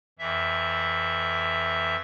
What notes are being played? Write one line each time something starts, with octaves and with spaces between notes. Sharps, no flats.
F2 E3 E5